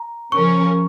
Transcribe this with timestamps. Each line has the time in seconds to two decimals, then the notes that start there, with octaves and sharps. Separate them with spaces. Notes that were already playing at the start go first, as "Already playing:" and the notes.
Already playing: A#5
0.32 C#3 F3 C#4 A#4 C#6